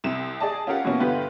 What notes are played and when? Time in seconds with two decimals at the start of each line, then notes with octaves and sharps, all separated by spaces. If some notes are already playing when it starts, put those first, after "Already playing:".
0.04 C2 C3 E7
0.40 G#4 D5 D#5 A5
0.67 C#4 F4 G4 A#4 F5 F#5
0.85 B2 E3 A#3 B3 C#4
1.00 G1 D3 B3 F4 G4 B4